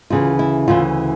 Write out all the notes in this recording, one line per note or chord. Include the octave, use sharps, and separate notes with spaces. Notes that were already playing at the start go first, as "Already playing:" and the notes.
D2 C#3 E3 F4
E4
D2 C#3 E3 F4